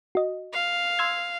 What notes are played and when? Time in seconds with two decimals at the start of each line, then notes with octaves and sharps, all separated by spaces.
0.15 F#4 D#5
0.53 F5
0.99 C6 E6 G#6